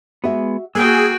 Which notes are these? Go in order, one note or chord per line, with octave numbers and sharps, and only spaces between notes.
G#3 B3 F#4 E5
A#3 F#4 G#4 G5 E6